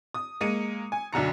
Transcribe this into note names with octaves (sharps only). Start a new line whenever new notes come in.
D#6
G#3 A#3 C#7 D#7
G#5
B1 F#2 D3 A#5 C#7